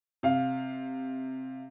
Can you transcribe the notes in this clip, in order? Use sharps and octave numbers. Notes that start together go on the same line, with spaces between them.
C3 F5